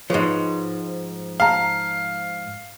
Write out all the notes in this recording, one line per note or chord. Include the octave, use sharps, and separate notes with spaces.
G#2 F3 B4 C#5
F5 A5 A#5